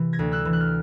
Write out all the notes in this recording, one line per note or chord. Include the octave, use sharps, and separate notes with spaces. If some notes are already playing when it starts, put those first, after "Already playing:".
Already playing: C3 E3
G#6 A#6
D2
E6 F#6
E3
F#6
F6